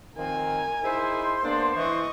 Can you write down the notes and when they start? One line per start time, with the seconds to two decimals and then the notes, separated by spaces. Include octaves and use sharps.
0.18 D#3 F3 C4 A#4 G#5
0.83 D#4 E4 G#4 C5
1.44 A#3 B3 D4
1.75 E3 D#5 C#6